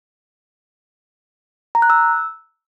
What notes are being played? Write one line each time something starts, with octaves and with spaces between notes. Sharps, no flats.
A#5
F#6
E6